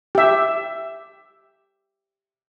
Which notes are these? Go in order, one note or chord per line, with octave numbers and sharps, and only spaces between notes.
G4 E5